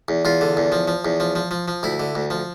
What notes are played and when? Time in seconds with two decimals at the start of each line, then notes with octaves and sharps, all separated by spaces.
0.08 E2
0.25 E2 F4
0.41 D3
0.57 E2
0.72 F3
0.88 F3
1.05 E2
1.20 F3
1.36 F3
1.51 F3
1.68 F3
1.83 D2 E4
2.00 D3
2.15 D2
2.30 F3